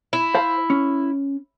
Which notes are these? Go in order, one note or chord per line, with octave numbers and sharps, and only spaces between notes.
E4
C5 F5
C#4